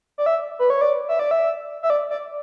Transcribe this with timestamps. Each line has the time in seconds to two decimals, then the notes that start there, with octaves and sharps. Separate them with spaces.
0.18 D5
0.26 E5
0.59 B4
0.70 C#5
0.81 D5
1.09 E5
1.19 D5
1.31 E5
1.83 E5
1.90 D5
2.10 D5